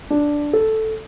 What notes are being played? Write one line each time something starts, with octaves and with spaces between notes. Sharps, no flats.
D4
A4